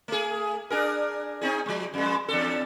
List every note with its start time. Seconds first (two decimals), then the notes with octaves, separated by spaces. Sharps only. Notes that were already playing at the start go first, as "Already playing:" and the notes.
0.08 A3 G#4
0.70 D4 G#4 A#4
1.41 C4 D#4 G#4
1.66 F3 G#3
1.94 F2 G#3
2.28 E2 D4 A4